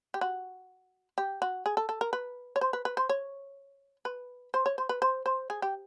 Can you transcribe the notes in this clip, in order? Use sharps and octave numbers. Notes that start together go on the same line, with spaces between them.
G4
F#4
G4
F#4
G#4
A4
A4
A#4
B4
C#5
C5
B4
B4
C5
C#5
B4
C5
C#5
C5
B4
C5
C5
G#4
G4